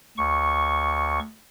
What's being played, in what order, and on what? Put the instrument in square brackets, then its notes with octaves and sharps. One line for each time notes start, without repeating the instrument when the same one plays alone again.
[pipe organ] D2 C#6